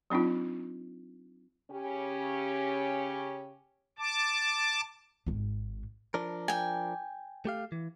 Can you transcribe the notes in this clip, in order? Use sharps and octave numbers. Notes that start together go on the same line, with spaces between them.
F#3 C4 D4 D#4 F4
C#3 C#4 G4
A5 D6
G#1 G#2
F3 D4 A#4
G5 G#5
A3 G4 F5
E3